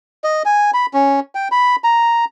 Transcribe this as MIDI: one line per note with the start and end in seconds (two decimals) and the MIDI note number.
0.24 0.43 75
0.45 0.71 80
0.74 0.86 83
0.94 1.20 61
1.35 1.48 79
1.52 1.76 83
1.84 2.25 82